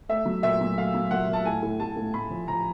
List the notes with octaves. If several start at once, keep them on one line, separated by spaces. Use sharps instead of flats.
A3 E5
F#3
A#2 E5
F#3
A3 F5
F#3
A#2 F#5
A#2 A5
A2 G#5
A2
A2 A5
A2
A2 B5
F3
F3 A#5